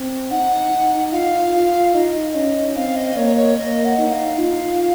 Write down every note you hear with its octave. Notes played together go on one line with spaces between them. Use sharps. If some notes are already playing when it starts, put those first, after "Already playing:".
Already playing: C4
D#4 F#5
D#4
F4 F5
F4
D#4 D#5
C#4
C4 F5
D#5
A#3 C#5
C#5
A#3 D#5
F#5
D#4
F5
F4